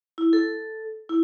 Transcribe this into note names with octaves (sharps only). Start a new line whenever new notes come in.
E4
A4
E4